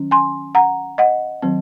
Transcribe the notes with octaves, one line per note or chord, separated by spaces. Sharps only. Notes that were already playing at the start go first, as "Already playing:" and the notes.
Already playing: D#3 F#3 C#4
G#5 C6
F#5 A#5
D#5 F#5
D#3 F#3 C4